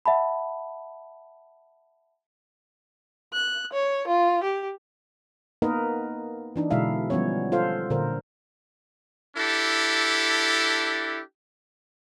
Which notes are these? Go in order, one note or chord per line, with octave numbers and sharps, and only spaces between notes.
E5 F#5 A5 B5
F#6
C#5
F4
G4
A#3 B3 D#4 A#4 B4 D#5
E3 D4 D#4
B2 D3 G#3 E4 E5 F5
F3 G3 B3 C#4 C#5
F4 A4 C5 F5
A#2 D3 A#4 C5
D4 E4 G4 A4